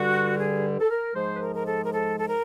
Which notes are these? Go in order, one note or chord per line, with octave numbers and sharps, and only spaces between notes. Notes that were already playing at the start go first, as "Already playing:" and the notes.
Already playing: G2 D3 G3 F#4
G#4
A4
A#4
G#2 F3 G#3 C5
B4
A#4
A#4
A4
A#4
A4
A4
A#4